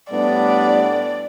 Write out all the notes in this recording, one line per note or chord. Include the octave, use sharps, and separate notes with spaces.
A2 G3 B3 D4 D5